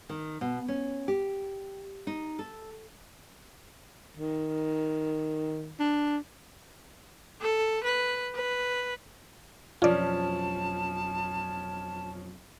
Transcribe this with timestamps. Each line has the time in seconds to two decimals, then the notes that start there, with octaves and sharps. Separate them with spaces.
0.09 D#3
0.41 B2
0.68 C#4
1.08 G4
2.07 D#4
2.39 A4
4.17 D#3
5.79 D4
7.42 A4
7.84 B4
8.35 B4
9.82 F2 B2 F3 F#3 C#4 F4 D5 A5